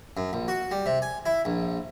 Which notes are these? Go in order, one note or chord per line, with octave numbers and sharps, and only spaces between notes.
F#2
A#1
F#4
G3
C3
G#5
E4
A#1